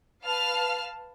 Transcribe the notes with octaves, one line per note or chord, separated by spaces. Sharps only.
B4 F5 A5 F6